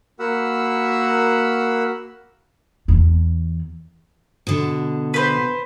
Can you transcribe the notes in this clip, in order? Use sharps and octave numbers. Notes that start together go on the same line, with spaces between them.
A#3 F#4 A#4 F#5 B5 E6
E2
B2 D3
B4 C5